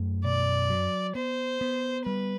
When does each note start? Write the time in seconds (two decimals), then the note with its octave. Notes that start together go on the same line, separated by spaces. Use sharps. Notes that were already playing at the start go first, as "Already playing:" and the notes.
Already playing: F#2 A3
0.24 B2 D5
0.70 F#3
1.15 B3 C5
1.61 B3
2.06 G3 B4